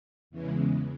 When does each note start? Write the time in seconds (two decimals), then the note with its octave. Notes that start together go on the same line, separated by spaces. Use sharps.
0.30 E2 C#3 E3 G#3